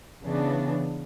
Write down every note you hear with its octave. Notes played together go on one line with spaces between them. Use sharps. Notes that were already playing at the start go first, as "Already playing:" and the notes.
C#3 E3 B3 D4